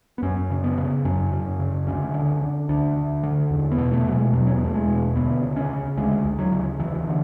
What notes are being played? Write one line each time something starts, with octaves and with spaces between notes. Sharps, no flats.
B3
F#2 C#4
C#3
B3
C#3
F#2 C#4
F#2
C#3
D2 C#4
D3
D3
D2 D4
D2
D3
E2
B3
B2
A3
B2 F#3
G#3
E2 F#3
C#4
B3
E2 A3
G#3
B2
D2 B3
C#3
C#4
C#3
D2 G#3
D2
F#3
C#3
D2 E3
D3